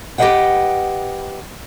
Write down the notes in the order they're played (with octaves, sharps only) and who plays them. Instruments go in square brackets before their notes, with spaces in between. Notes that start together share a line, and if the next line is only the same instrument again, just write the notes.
[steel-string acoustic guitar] G4 B4 C5 D#5 F#5 G5